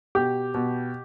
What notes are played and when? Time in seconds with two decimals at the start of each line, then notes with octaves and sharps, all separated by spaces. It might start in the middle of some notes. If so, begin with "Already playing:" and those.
0.15 B2 G4
0.54 B2